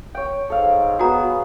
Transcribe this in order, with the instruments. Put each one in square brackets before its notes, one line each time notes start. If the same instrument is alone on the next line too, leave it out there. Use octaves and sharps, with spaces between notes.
[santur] C#5 G5
[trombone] G#2 [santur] A4 F5
[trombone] B3 [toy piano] F#4 A#5 [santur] G#4